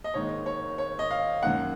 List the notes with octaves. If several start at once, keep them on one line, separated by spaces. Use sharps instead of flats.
D#5
G#1 G#2 D#3 A#3 C#5
C#5
C#5
D#5
F5
F#2 D#3 A#3 F#5